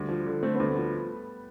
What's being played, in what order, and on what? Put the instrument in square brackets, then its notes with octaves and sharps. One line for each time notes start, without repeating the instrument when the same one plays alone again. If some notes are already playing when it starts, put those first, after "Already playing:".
Already playing: [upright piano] D2 [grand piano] G3
[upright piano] F3
D3
[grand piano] A3 [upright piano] C4
[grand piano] B3
[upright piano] D2
[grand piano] A3
[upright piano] F3